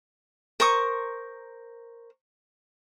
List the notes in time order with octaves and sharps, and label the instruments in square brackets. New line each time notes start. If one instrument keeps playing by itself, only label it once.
[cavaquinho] A#4 C5 C#6 D#6